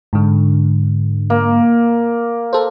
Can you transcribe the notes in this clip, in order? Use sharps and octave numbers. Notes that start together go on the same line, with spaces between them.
G#2 D3
A#3
A4 C5